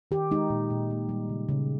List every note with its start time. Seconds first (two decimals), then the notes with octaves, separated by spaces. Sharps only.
0.11 D#3 G4
0.31 G#3 D#4
0.50 A#2
0.70 A#2
0.91 A#3
1.09 G3
1.29 C#3
1.49 C#3